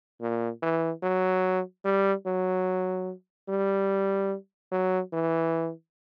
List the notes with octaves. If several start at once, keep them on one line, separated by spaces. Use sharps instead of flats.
A#2
E3
F#3
G3
F#3
G3
F#3
E3